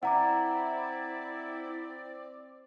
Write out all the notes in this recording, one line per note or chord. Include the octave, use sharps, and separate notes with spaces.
C4 E4 D5 F#5 A#5 D6